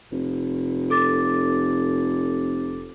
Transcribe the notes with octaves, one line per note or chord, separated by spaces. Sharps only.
F1
A4 D6 A6